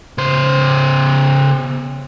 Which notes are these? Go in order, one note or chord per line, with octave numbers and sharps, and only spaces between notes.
C#3 C5